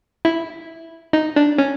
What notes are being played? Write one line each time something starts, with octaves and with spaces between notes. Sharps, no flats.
E4
D#4
D4
C#4